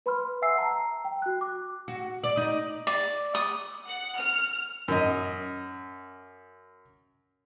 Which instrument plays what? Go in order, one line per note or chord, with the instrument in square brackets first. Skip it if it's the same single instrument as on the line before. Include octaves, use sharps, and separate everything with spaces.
[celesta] B4 B5 C6 F6
E5 F#5 G#5 E6 C7
A5 A#5
G5
F#4 F#6
D6
[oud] F#4
D5
D#4
[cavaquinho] D5
D#6
[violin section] F#5
F6
[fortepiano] F#2 D#5